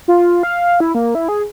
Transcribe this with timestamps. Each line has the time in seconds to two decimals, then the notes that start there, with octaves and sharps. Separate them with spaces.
0.08 F4
0.43 F5
0.80 E4
0.95 A#3
1.15 E4
1.28 G#4